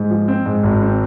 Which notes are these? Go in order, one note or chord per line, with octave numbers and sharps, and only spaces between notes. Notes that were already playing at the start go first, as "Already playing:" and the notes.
Already playing: G#2
F3
C4
G#2
G#1
C4